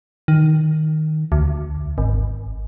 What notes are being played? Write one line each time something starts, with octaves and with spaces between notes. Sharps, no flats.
D#3
D2
G#1